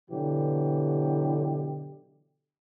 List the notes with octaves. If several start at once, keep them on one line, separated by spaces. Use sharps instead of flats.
B2 D3 E3 F#3 G4